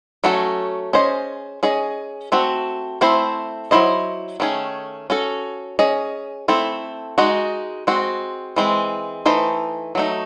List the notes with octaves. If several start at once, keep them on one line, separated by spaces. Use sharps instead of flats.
F#3 A3 C#4 F#4 A4
C#4 G#4 C5 D#5
C#4 G#4 D#5
A3 C4 F#4
A3 C4 E4 C5
F#3 C4 E4 C5 D#5
D#3 A3 C#4 G#4
C#4 F#4 A4
C#4 G#4 D#5
A3 C4 E4 A4
G#3 D#4 F#4
G#3 C4 F#4
E3 G#3 C4
E3 A3 D#4 A4 C5
F#3 A3 D#4